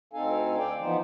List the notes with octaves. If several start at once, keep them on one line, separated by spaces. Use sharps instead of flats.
D2 C4 D#4 A4 F5 G#5
D5 F5 G5
E3 F3 B3 D#4 C5